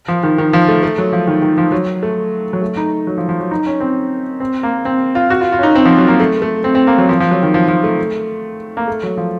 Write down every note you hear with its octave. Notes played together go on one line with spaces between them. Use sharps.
F3
D#3
D#3
F3
A3
A3
F#3
F3
D#3
D#3
F3
F#3
A3
F#3
A3
D#4
F#3
F3
F3
F#3
D#4
C#4
C4
C4
A#3
C4
F4
F#4
F4
F4
C#4
D#4
C4
F3
F#3
A#3
A3
A3
C4
C4
A#3
F#3
F3
F3
F#3
D#3
F3
F3
A3
A#3
A3
F#3
F3